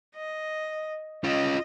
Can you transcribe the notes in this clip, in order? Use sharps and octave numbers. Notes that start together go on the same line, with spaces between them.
D#5
C#4 F4 D#5